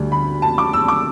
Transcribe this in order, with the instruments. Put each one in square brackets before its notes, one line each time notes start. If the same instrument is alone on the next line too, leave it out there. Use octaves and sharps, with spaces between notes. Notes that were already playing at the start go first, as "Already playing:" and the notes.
Already playing: [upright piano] D2 D3 G3 D4
B5
A5
D6
E6
D6